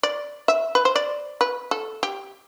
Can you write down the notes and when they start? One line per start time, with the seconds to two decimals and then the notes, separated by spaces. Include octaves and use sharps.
0.03 D5
0.48 E5
0.75 B4
0.85 C5
0.96 D5
1.41 B4
1.71 A4
2.03 G4